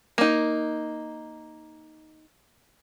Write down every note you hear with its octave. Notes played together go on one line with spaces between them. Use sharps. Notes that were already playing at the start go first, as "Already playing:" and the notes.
A#3 D#4